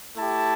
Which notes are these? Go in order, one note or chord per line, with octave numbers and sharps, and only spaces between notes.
A3 E4 G4 A5